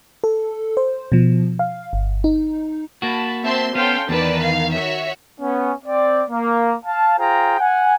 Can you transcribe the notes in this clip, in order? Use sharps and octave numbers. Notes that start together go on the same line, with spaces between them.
A4
C5
B2 F3
F5
G1
D#4
A#3 F#4 A5 B5
C4 E5 A5 C6
B3 C#4 A4 F5 G5 C6
E2 D#3 B4 D5 A5
F5
F#4 C#5 E5
B3 C#4
C4 D5
A#3
F5 A5
F4 G#4 C5 G5 A#5
F#5 G#5